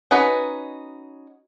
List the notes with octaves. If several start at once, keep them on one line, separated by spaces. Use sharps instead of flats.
C#4 D#4 F#4 B4